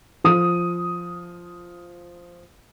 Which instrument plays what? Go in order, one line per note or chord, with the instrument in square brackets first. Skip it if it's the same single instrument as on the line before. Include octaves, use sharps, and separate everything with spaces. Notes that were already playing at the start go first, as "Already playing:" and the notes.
[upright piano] F3 D#6